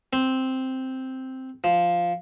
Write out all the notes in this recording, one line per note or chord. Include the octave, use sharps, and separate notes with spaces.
C4
F3